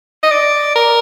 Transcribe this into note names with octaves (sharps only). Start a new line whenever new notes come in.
D#5
D5
A#4